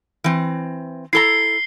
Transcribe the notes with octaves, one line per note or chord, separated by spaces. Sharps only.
E3 C4
E4 A4 A#5 C7 G7